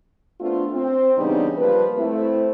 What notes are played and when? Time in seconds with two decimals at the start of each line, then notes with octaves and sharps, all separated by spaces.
0.40 A3 B3 C4 D4 F4
0.74 C4
1.16 C#3 E3 G3 B3 D4 D#4
1.57 F3 G3 A#3 A#4 B4
1.97 A3 C4 E4